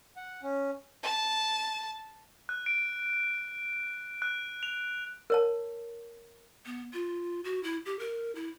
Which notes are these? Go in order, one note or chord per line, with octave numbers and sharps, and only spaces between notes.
F#5
C#4
A5
F#6
D7
F#6
F7
A#4 C#5 A5
B3
F4
F#4
E4
G4
A#4
E4